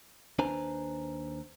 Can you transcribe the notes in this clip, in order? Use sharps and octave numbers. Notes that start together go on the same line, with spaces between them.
D#2 D4 B4 C5 G#5 A#5